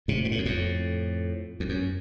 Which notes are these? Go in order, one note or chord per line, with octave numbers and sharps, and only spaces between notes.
A2 C3
A#2
A2
F#2
F2 A2
F2
F#2